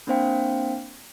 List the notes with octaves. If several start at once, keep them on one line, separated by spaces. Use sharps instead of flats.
A#3 C4 D4 C5 F5 G5